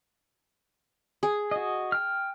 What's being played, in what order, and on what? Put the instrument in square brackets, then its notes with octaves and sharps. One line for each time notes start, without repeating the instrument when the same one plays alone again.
[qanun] G#4
[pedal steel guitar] F#4 D#5
G5 F6